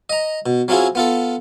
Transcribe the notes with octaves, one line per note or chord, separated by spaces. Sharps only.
D#5 A#5
B2
F#3 C4 C#4 E4 F4 G#4
B3 F4 A4